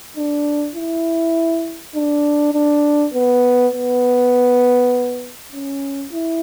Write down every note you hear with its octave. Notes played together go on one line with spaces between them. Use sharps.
D4
E4
D4
D4
B3
B3
C#4
E4